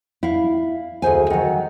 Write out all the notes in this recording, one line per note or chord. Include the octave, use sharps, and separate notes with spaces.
E4 F5
D2 G#4 C5 G#5
D#3 F#3